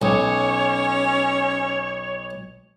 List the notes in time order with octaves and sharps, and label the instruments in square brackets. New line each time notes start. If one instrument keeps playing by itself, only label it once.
[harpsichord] B1 [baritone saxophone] C#4 [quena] C#5